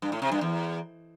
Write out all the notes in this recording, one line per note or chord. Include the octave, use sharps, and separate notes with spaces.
G2
A2
C3
G2
E2